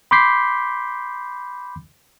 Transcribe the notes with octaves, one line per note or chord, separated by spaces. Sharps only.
B5 C6 D6 G6 B6 C7